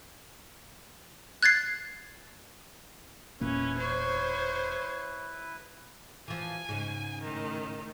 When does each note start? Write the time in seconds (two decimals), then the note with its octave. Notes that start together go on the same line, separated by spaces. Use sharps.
1.43 F#6 G#6 A6 C7
3.41 E1 A#2 A#3 C#4 E4 B4
3.79 C5 C#5
6.28 E3 F3 G#5
6.69 G#2 C#3
7.21 A2 D#3